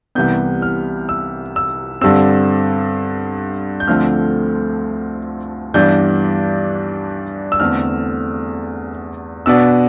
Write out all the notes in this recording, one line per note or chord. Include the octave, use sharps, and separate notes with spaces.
C2 C3 E3 G3 B3 G6
F6
E6
E6
G2 D3 G3 C4 E6
G6
D2 D3 F3 A3 C4 F6
G2 E3 G3 B3 D4 G6
E6
E2 D3 A3 C4 F6
B2 B3 D4 E6